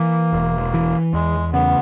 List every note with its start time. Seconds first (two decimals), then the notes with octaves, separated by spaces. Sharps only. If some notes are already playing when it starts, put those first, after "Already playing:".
Already playing: E3 A#3
0.33 E1
0.74 E3
1.13 E2 G#3
1.53 C#3 B3